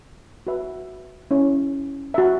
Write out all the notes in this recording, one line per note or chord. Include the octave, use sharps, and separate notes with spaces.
F#4 B4 E5
C#4 E4 C#5
F#4 E5